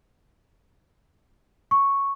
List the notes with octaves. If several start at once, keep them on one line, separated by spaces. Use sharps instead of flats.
C#6